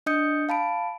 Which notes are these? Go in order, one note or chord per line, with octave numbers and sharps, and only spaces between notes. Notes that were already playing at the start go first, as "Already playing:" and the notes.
D4 D#5 D#6 G6 C#7
F5 A5 B5 D7